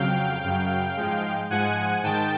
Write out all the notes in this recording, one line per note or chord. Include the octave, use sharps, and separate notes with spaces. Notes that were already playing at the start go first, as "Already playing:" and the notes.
Already playing: F2 C#3 F#3 F5 G5
F#2 C#3 F#3
G#2 F3 G#3
G#2 F3 G#3 F#5 G#5
G#2 D#3 G#3 G5 A5